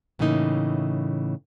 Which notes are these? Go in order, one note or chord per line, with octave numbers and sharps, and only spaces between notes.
A2 C#3 E3 A#3 D#4